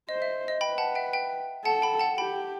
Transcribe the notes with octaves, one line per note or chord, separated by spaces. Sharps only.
C5 D#5
E5
D#5
B4 G5 B5
F#5 A5
E5 G5
E5 G5
A4 F#5 A5
G5 B5
F#5 A5
G4 G5 B5